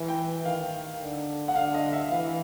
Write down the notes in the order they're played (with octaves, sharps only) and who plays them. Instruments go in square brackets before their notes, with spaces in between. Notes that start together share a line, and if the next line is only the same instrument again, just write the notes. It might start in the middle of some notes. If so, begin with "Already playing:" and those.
Already playing: [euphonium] E3
[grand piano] G5
[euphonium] D#3 [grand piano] F5
[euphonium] D3
[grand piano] F#5
[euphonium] D3 [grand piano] F5
[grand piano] D#5
E5
[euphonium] E3 [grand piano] F5